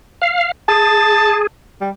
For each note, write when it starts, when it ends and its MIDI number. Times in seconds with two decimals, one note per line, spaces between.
0.22 0.52 77
0.68 1.47 68
0.68 1.39 81
1.81 1.90 55